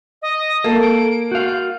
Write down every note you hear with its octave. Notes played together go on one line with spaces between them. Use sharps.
D#5
A#3 A4
D7
F#4 F5 G6